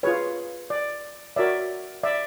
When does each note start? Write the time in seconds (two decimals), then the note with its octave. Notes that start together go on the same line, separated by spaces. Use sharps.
0.03 F4 G#4 B4 C#5
0.70 D5
1.36 F#4 A#4 C#5 D5 E5
2.03 D5 E5